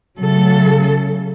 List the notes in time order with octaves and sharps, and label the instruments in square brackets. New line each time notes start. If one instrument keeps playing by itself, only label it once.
[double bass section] C#3 [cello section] F#3 A3 A4